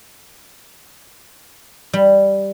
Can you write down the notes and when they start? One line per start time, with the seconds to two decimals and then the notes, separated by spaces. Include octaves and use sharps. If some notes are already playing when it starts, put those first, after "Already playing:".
1.93 G3